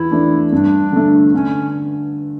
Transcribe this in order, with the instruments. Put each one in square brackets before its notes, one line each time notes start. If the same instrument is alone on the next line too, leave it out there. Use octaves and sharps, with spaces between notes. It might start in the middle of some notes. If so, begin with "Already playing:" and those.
Already playing: [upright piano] E2 [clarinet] E4
[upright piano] E3 A3 D4
[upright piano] G2 [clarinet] D4
[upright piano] D3 A3
[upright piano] D3 [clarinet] C#4